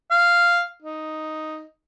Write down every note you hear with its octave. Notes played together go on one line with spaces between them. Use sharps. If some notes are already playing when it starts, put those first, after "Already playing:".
F5
D#4